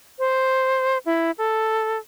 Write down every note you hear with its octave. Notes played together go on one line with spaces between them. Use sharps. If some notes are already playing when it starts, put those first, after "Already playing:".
C5
E4
A4